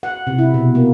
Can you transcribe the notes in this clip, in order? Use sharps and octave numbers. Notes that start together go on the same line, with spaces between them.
F#5
C3
E4
B2
A#3